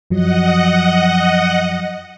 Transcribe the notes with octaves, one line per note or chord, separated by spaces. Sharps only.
F#2 F3 F#3 D#5 F#5